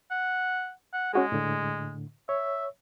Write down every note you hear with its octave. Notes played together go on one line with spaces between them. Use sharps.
F#5
F#5
G#3 C#4 F#4 G#4
A2 D3
C#5 E5